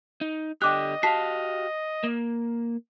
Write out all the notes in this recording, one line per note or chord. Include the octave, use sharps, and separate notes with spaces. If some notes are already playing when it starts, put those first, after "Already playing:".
D#4
D3 G4 D#5 G5 D6 F#6
F#4 G4 F5 A5 B6 C7
A#3